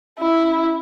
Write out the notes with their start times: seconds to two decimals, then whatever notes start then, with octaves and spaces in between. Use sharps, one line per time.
0.19 C#4 E4